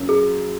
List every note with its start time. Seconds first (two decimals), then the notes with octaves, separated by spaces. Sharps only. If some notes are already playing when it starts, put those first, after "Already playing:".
Already playing: F#2 C#3 F#3 A#3 C#4
0.09 G#4